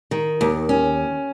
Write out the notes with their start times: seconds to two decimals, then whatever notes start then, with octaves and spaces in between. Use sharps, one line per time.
0.11 D#3
0.41 D#2
0.69 C#4